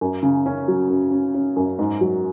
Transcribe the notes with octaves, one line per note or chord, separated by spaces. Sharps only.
F#2
C#3
C#4
F#3
F#2
C#4
C#4
F#2
G#2
F#3